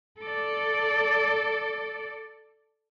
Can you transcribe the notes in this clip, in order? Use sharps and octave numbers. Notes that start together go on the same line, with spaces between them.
A4 D5